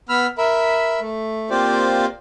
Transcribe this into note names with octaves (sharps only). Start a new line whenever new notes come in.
B3 B5 E6 F6
A#4 E5 B5
A3
A#3 C4 F4 G4 C5 D5